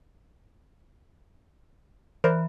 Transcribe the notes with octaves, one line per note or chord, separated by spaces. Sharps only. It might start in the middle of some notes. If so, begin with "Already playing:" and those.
E3 A#4 C5 D5